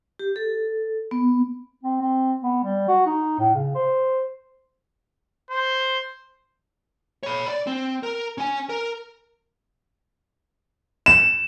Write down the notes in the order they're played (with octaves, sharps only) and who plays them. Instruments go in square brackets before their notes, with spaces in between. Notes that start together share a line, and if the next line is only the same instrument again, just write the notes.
[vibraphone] G4
A4
B3
[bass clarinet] C4
C4
B3
G3
F#4
D#4
A2
C#3
C5
[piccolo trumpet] C5
[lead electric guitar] C#5 B5
D5
C4
A#4
C#4 G#5
A#4
[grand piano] E7